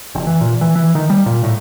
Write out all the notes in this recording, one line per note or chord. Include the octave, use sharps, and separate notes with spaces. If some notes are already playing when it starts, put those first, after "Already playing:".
F1
E3
A#2
E3
E3
D#3
G3
A#2
A2